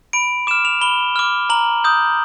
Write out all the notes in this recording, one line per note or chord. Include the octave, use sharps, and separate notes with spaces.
B5 D7
D6 F6 E7
F7
B5 G7
D6 F6
A#5 F#7
D#6 G6